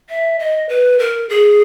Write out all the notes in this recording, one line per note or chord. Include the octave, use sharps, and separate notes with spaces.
E5
D#5
B4
A#4
G#4